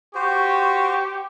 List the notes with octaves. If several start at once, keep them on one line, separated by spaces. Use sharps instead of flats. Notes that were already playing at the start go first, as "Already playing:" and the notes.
F#4 G4 C5 C#6